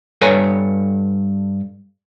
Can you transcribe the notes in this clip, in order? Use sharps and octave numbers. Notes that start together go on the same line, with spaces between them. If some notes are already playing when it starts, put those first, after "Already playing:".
G2 A4 B4 C#5 G#5 A#5